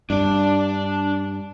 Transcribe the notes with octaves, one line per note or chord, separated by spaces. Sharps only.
G2 D4 D5